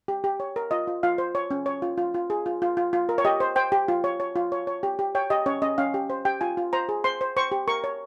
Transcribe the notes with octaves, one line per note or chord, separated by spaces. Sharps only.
G4
G4
C#5
A#4
F4 D#5
F4
F4 F5
C5
C#5
C#4
C#5
F4
F4
F4
G#4
F4
F4
F4
F4
A#4
C#5
G4 D#5
C5
C5 G5
G4
F4
C#5
C#5
F4
C#5
C#5
G4
G4
C#5 G5
G4 D#5
C#4 C#5
C#4 D#5
C#4 F5
G4
C5
G4 G5
F4 G#5
F4
C5 A#5
G#4
C5 C6
C5
C5 C#6
G4
A#4 C#6
C#5